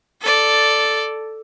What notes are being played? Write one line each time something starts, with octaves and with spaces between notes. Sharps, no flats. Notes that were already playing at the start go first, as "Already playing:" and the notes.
A4 D5